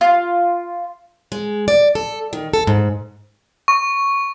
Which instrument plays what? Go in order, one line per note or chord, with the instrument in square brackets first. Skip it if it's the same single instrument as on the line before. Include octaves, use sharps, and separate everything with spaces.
[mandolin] F4
[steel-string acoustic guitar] G#3
D5
A4
D#3
A4
G#2
[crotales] C#6